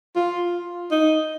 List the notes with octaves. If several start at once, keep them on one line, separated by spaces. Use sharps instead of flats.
F4
D#4